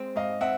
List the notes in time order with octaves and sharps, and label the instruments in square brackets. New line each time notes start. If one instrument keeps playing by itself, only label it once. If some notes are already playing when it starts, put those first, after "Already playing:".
Already playing: [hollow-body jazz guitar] G#3 C4
[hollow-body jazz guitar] G#2 [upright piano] D#5 F5
[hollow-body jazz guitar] C4 [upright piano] E5 F#5